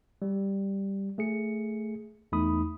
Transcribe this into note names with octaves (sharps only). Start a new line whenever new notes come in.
G3
A3 G#4 C#7
E2 A3 D#4 B5 D#6